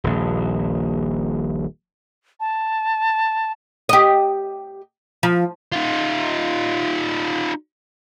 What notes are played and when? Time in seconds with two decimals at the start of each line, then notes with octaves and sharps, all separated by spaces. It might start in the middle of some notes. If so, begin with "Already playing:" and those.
0.04 D#1 A#1
2.40 A5
3.89 G4 D#5
5.23 F3
5.72 D#4 F4